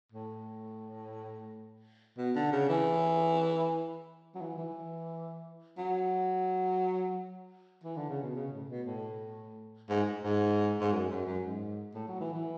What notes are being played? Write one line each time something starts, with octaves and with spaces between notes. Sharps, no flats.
A2
B2
D3
C#3
E3
F#3
E3
E3
F#3
E3
D3
C#3
B2
C#3
A2
B2
A2
G#2
G#2
G#2
F#2
F#2
F#2
G#2
A2
F#3
E3
E3